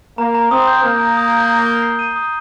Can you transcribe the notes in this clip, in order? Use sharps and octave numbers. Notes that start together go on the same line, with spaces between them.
A#3 A#5
A#5
C4 D#6
G6
A#3 A#5
A#5
D#6
G6
D#6
G7
C7
D#7
D#6